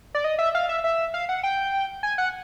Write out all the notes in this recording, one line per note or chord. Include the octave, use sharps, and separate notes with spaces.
D5
D#5
E5
F5
E5
E5
F5
F#5
G5
G#5
F#5